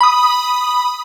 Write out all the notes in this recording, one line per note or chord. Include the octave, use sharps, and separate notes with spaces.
B5 D#6